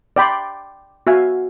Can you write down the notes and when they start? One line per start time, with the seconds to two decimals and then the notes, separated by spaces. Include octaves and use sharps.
0.16 D5 G5 B5 C6
1.07 F#4 E5 F5 G#5